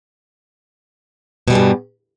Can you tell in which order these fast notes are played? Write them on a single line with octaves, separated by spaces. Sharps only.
B2 G3 E2 G2